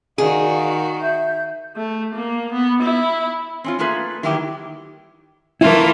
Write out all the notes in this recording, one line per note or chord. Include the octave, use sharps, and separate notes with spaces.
D#3 F#4 G#4 D5 F5
E5 G6
A3
A#3
B3
E4
C4 C#4 F4
A3 A#3 F4 G#4 B4
D#3 F#3 G3 E4 G4
E3 A3 E4 F4 A#4